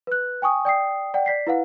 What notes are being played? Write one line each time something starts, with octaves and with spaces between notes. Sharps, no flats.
B4 F#6
G5 G#5 C#6 D#6
D5 G5 D#6 C7
D5 F#5 G5
D5 B6 C7
E4 B4 F5 F#5